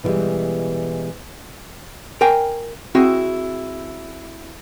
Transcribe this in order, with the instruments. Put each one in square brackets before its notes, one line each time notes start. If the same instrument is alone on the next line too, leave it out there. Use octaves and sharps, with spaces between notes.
[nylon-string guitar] B2 E3 F3 G3 G#3
[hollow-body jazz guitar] A#4 G5 G#5
C4 E4 F#4 G#4